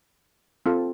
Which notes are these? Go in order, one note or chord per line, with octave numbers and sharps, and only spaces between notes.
C4 F4 A4